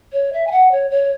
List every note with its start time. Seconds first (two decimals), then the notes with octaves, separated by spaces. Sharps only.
0.12 C#5
0.33 E5
0.47 G#5
0.51 F#5
0.71 C#5
0.90 C#5